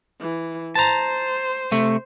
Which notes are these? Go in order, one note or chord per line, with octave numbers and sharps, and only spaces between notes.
E3
C5 A5 A#5
C3 A3